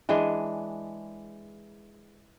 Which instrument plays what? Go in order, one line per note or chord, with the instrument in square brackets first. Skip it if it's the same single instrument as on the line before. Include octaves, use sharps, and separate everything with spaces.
[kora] E3 G#3 D4 G#4